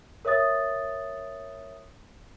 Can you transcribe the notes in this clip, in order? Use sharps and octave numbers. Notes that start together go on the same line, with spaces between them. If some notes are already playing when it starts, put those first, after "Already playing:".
A#4 C#5 E5 D#6 A6